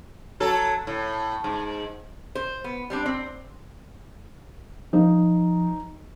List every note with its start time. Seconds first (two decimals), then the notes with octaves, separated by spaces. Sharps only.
0.40 F#3 A4
0.87 A2
1.44 G#2
2.35 C5
2.64 B3
2.90 G3 C4 D4
3.06 C4
4.93 F3 D#4